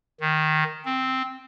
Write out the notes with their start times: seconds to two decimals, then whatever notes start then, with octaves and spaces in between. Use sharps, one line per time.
0.21 D#3
0.85 C4